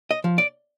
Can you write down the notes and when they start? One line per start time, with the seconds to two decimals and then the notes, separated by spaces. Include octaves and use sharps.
0.11 D#5
0.24 F3
0.38 D5